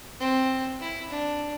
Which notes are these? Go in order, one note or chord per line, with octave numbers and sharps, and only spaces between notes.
C4
E4
D4